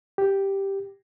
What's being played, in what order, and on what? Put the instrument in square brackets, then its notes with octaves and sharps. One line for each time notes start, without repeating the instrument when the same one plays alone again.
[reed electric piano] G4